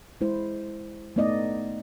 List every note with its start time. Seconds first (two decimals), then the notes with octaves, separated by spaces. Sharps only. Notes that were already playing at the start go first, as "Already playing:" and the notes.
0.21 G#3 E4 C5
1.16 A3 B3 D#4 D5 D#5